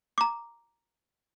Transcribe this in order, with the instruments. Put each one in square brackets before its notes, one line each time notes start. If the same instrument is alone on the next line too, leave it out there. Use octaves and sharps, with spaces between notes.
[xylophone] A#5 D6